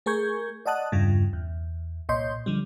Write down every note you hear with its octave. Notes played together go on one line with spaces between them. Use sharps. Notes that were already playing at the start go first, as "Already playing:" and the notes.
A3 G#4 A#4 C#6 G6 G#6
D5 D#5 F#5 A5 D#6 F#6
E2 G2 C#3 F4
E2
C2 A#2 C#5 D#5 C6 G6
D3 F3 G3